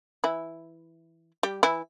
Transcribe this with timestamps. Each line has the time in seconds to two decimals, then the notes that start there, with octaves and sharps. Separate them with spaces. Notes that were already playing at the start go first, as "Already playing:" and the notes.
0.24 E3 E4
1.43 G3 G4
1.63 E3 E4